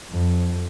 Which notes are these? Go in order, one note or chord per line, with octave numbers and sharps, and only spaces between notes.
F2